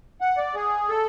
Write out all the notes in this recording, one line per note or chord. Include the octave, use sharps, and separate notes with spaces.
F#5
D5
G#4
A4